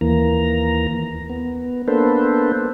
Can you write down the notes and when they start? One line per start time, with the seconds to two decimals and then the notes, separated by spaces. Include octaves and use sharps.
0.01 D#2 E3 A#3 A#5
1.30 B3
1.88 A#3 B3 D4 A4 B4 C5